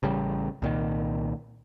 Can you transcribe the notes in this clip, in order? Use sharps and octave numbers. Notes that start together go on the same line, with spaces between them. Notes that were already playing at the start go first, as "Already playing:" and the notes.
A1 C#3 G3
C2 A#2 D#3